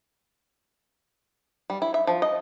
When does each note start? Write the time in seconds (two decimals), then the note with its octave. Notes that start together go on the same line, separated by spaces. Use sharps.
1.70 G3
1.82 E4
1.94 E5
2.07 F3
2.22 D#5